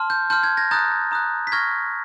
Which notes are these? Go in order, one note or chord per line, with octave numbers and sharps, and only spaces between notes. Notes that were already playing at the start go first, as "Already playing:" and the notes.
Already playing: A5 C6 F6
G6
A5 C6 F6 G6
G#6
G#6 A#6
A#5 D#6 F#6 G6 A6
A#5 D#6 F#6
B6
C#6 F6 G#6 A#6